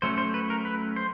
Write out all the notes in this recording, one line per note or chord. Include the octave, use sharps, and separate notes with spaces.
F#3 A3 C#4 C5
C5
B4
A#4
B4
C5